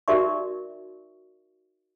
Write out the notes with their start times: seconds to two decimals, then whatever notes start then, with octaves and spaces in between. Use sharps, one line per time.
0.08 D#4 F#4 A#4 D5 E5 C#6